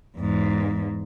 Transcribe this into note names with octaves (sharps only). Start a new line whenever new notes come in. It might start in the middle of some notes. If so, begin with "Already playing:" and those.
E2 G#2